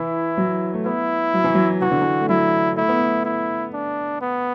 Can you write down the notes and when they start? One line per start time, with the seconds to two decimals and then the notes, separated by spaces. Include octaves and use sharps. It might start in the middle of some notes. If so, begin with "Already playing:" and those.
Already playing: E3 E4
0.37 F#3
0.74 A3
0.85 B3 E4
1.34 F#3
1.44 E3
1.54 F#3
1.82 E3 F#4
1.91 D3
2.01 E3
2.21 A3
2.29 F#3 E4
2.77 A3 E4
2.88 B3
2.99 A3
3.25 E4
3.74 D4
4.21 B3